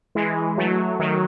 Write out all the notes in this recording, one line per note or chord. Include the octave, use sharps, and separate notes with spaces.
E3 G#3
F#3 A3
D#3 F#3